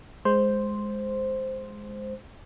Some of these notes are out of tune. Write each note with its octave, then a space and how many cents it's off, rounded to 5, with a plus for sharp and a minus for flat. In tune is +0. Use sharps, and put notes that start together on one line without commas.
G#3 +0 C5 +0